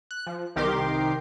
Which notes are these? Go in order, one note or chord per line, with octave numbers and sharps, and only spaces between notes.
F#6
F3
C2 D#3 G4 A#4 C6 D6